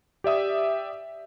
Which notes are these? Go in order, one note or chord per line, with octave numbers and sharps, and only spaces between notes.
G4 D5 E5 D#6